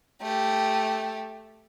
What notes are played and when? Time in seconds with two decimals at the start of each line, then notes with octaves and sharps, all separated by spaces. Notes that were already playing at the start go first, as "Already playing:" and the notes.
0.22 A3 G4